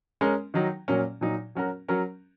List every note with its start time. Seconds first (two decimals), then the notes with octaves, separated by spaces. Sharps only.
0.21 G#3 C#4 A#4
0.54 D#3 F#3 D#4
0.88 A#2 F#3 A#3 C#4
1.21 A#2 F#3 D#4
1.55 F#3 C#4 F#4 A#4
1.88 F#3 C#4 A#4